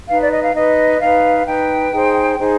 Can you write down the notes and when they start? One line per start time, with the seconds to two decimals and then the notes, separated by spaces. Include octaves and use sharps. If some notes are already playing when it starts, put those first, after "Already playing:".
0.09 D#4 B4 F5
0.20 D5
0.32 D#5
0.43 F5
0.54 D#4 B4 D#5
1.00 D#4 B4 F5
1.46 D#4 B4 G5
1.93 D#4 G#4 C5
2.38 D#4 G#4 C5